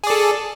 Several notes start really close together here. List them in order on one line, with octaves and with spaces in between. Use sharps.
G#4 D5 A4